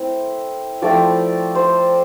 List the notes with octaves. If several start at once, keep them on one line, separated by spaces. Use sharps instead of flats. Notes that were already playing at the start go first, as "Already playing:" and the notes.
Already playing: A3 C4 E4
F3 A3 C4 E4 D5
C5